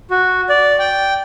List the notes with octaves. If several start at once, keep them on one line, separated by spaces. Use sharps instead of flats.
F#4
D5
G5